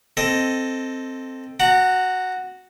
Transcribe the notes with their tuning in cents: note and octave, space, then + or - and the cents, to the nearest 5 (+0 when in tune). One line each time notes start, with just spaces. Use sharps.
C4 +0 A4 +0 D#5 +0
F#4 +0 F#5 +0 A#5 -40